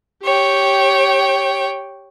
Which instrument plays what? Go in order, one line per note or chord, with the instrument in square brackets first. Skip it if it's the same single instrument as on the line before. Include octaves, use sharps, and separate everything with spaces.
[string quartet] G4 C#5 G5